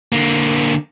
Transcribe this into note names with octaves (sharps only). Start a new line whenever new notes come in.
D3 A#3